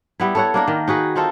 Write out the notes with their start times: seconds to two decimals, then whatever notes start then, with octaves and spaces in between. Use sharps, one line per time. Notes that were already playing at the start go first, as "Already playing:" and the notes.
0.20 G3 B3 E4
0.35 A4 C#5 F#5
0.54 A#3 D4 A#4
0.68 D#3
0.88 D#4 F#4 G#4 B4
1.16 C4 D#4 F4 A4